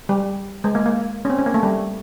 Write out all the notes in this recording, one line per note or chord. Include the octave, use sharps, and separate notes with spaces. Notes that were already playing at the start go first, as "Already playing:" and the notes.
G3
G#3
A#3
A#3
C#4
C4
C#4
A#3
A3
G3